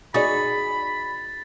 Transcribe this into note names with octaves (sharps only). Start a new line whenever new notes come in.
D#4 F#4 G#4 D5 B5 A6